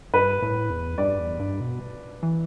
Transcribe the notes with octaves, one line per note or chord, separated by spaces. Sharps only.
G2 B4
A2
E2
G2 D5
E2
G2
B2
E3